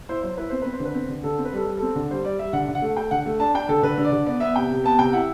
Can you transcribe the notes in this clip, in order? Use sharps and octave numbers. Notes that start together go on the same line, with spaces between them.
E4 C5
F#3 C5
E4 B4
C4 C5
C4 B4
C5
D3
B4
C4
D3
D3 A4
C4
B4
G3 A4
G3
C4 A4
D3
G3 C5
G3 D5
G3 E5
D3 F#5
D3
F#5
A3
A3 G5
D3 F#5
A3
D4 A5
D4 G5
D3 A4
D3 B4
D3
D5
D3
B3 D5
B3 E5
C3 G5
C3
B3 A5
C3 G5
E4 F#5